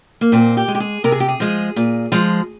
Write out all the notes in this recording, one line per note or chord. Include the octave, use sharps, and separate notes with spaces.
A#3
A#2 C4
G4
G#3
G4
G#4
C3 A#4
G#4
G4
G#4
F3 G#3
A#2
F3 G#3